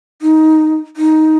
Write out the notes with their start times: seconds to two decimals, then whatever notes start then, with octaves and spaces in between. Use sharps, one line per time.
0.22 D#4
0.97 D#4